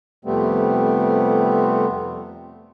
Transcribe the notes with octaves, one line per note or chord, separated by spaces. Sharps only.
F2 C3 G3 A3 B3 C4